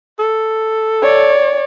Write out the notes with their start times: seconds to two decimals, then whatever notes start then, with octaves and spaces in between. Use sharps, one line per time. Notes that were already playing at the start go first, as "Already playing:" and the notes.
0.19 A4
1.02 C#5 D5